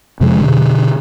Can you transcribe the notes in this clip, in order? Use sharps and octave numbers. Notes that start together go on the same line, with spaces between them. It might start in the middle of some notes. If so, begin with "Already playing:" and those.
F2 C3 F3 G#3
B2 D3